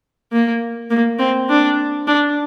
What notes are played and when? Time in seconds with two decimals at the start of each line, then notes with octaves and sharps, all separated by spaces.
0.32 A#3
0.90 A#3
1.19 C4
1.49 D4
2.07 D4